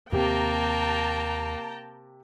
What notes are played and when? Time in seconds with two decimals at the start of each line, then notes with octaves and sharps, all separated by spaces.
0.12 D#2 C3 A#3 G4 G5 A5 A#5